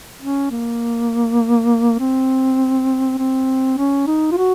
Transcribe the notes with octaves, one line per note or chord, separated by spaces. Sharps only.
C#4
A#3
C4
C4
C#4
D#4
F4
F#4